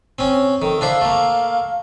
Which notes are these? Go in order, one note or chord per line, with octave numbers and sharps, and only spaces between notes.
C4 C#4
D#3 A4
D4 E4 C5 F5
A3 A#3